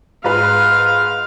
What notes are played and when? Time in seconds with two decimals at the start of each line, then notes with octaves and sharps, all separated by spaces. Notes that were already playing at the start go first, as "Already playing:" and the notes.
0.24 G#2 F4 B4 F5